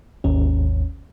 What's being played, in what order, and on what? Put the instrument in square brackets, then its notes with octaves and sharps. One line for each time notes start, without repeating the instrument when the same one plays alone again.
[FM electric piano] G#1 D#2 C#4